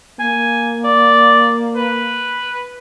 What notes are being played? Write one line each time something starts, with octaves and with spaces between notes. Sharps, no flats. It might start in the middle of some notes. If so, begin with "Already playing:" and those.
A#3 G#5
D5
B4